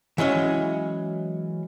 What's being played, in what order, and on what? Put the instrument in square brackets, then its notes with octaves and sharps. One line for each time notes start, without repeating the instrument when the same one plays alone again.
[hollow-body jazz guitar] E3 F#3 G#3 C#4